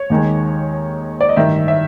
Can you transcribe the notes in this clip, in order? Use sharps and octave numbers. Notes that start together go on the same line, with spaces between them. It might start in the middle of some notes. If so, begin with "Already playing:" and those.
Already playing: C#5
D#2 D#3 G#3
D5
D#5
A1 G2 D#3 E5
E5